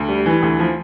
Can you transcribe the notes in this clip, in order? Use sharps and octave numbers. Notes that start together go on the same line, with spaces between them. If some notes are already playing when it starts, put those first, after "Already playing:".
Already playing: D2
G3
E3
D2
F3